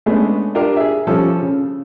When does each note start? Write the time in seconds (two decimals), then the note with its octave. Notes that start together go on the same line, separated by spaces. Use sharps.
0.06 G#3 A3 B3 C#4 D4 G#4
0.55 D4 F4 G4 A#4 F5
0.76 G#4 E5
1.07 F3 G3 C#4 A4
1.42 C#3